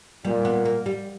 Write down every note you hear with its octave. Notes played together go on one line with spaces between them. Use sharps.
A#2 G3
B3
A#3
G3